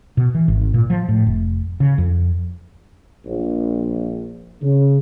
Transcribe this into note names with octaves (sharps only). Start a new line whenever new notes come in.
B2
E3
G#1
A#2
F3
A2
F1
C#3
F2
A#1
C#3